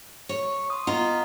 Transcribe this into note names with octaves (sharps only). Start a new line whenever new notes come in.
C#5
C6 D#6
B3 F4 D#5 A#5 D#6